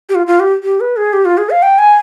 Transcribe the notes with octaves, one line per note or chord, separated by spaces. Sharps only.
G4
F4
F4
G4
G4
B4
G#4
G4
F4
G#4
F5
G5
G#5